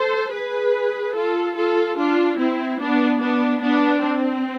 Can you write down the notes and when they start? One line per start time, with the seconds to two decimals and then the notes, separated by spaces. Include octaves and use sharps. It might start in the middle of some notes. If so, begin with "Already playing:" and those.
Already playing: A4 C5
0.34 G#4 B4
1.16 F4 A4
1.57 F4 A4
1.98 D4 F4
2.39 C4 E4
2.81 B3 D4
3.21 B3 D4
3.62 B3 D4
4.03 C4